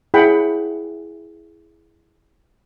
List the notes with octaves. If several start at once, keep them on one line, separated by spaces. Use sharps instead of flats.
E4 G#4 C#5 F#5 G5 B5